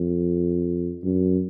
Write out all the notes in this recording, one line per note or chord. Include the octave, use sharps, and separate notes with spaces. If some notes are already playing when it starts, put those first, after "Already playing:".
Already playing: F2
F#2